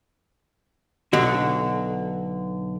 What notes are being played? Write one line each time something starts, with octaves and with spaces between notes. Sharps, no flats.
B1 D3 F#4